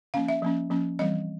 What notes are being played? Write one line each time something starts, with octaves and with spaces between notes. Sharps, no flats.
F3 A#3 C#4 F5
E5
F3 A#3 C#4
F3 A#3 C#4
E3 G3 C4 D#5